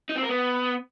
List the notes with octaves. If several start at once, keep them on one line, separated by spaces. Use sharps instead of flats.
D#4
C4
A#4
B3